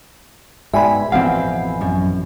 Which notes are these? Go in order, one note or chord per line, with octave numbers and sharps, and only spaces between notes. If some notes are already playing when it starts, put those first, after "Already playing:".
G#2 B2 F#4 D5 E5 G5 G#5 B5
A1 F2 B2 C4 F5 F#5
F#2